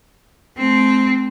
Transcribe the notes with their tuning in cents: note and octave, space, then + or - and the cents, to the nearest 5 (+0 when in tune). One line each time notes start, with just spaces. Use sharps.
A3 -45 C4 -5